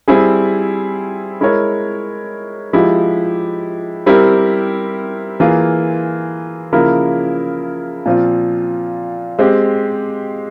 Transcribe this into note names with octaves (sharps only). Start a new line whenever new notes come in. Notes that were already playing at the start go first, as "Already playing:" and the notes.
G3 C4 E4 G#4
G#3 E4 A#4 C#5
F3 G#3 E4 G4
G3 C4 E4 G4 A#4
E3 A#3 F4 G#4
C#3 F3 A#3 E4 A#4
A#2 F3 C4 F4
G#3 C4 G4